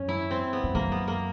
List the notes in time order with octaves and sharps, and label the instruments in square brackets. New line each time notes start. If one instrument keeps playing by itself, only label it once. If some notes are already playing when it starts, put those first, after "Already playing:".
Already playing: [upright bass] F#2 [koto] C#4
[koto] E4
C4
B3
[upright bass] F2
[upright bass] F#2 [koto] A#3
[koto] B3
A#3